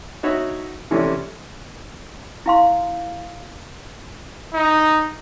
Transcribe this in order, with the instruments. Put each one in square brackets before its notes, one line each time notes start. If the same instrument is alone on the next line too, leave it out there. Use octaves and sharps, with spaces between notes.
[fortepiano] D#4 F#4 C#5 E5
C3 E3 A3 C#4 D4
[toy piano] E4 F5 C6
[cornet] D#4